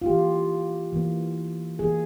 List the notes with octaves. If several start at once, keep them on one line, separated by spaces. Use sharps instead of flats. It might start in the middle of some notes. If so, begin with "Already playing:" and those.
F4
E3 A#3 G4
E3 A#3
E3 A#3 G#4